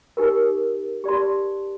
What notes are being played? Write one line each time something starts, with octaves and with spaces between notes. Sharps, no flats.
D#4 G4 A#4
G4 D5 A5 C6